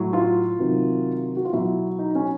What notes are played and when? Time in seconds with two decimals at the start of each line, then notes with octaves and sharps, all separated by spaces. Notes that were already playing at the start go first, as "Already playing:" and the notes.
Already playing: A2 F#3
0.13 F4
0.59 C3 D#3 F#3
1.37 F#4
1.45 F4
1.53 B2 F#3 E4
1.99 D#4
2.15 C#4